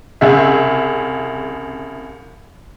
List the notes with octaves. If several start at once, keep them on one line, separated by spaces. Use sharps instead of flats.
C2 C#3 G#4 E5